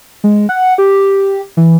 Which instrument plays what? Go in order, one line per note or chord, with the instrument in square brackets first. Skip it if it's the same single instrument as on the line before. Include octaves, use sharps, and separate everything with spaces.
[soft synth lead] G#3
F#5
G4
E3